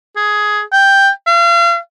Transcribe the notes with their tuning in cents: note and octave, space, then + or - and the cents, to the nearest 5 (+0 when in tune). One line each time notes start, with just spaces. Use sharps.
G#4 +10
G5 +5
F5 -40